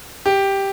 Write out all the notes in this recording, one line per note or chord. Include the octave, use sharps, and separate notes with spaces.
G4